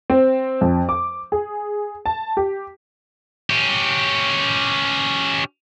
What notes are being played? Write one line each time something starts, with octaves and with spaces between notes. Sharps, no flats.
C4
F2
D6
G#4
A5
G4
C#4 G4